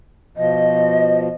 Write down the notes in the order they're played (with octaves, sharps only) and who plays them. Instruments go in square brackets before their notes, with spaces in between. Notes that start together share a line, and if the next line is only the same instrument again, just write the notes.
[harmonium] B2 F3 [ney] D#5